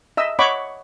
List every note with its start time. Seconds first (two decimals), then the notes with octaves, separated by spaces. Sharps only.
0.17 D#5 E5 E6
0.39 C#5 D#5 F#5 B5 C#6 D6